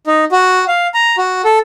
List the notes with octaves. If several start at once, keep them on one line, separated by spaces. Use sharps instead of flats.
D#4
F#4
F5
A#5
F#4
A4